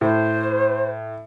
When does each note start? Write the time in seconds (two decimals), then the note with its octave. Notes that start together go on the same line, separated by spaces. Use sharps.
0.01 A2 C5